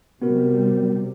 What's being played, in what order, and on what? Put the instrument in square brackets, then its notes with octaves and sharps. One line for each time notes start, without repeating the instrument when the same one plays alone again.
[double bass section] C3 G3 [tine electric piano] B3 F#4 A#4